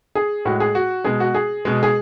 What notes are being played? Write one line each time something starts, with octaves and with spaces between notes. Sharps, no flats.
G#4
A2 G#3 F#4
G#4
F#4
B2 G#3 G#4
F#4
G#4
B2 G#3
G#4